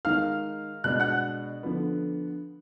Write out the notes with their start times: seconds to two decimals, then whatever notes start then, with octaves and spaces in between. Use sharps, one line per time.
0.05 D#3 G#3 D#4 F5 F6
0.84 B2 G#3 D4 F#6
1.00 F#5 F#6
1.63 D3 F3 B3